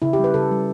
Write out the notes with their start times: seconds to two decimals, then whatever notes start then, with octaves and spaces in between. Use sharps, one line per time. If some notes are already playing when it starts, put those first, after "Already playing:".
0.02 C#3 E4
0.13 G4
0.19 G3
0.24 B4
0.34 C#3 A4
0.51 G3